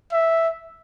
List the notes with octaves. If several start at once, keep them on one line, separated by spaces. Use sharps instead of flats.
E5